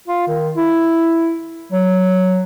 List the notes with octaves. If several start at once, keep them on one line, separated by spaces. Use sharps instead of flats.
F4
D#3
E4
F#3